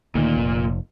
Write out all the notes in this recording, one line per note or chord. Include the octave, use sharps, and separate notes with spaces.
D2 A#2 D#3
F1